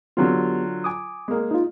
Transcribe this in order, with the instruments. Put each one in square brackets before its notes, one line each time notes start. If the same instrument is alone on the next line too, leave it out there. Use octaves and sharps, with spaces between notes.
[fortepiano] D3 F#3 F4 [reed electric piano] B3 G4
[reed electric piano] G#5 D6 D#6
[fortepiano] G#3 A#3
[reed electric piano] D#4 F4